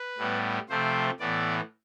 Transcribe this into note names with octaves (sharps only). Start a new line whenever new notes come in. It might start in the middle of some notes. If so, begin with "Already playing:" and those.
Already playing: B4
A2 G3 B3
C3 F3 A3 C4 C5
A2 E3 B3 D5